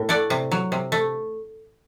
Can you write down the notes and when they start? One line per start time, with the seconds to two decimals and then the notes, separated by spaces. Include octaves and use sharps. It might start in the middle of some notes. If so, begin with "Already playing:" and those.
Already playing: A2
0.09 A3 D5 F#5
0.30 C3
0.52 F#3
0.72 C3
0.92 A3